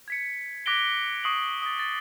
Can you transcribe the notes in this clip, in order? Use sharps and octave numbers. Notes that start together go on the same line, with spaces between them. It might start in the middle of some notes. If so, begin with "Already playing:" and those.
G#6 B6 C#7
D6 F#6 A#6 B6 D7 G7
C#6 D#6 C7 F#7
D#6 A6
A6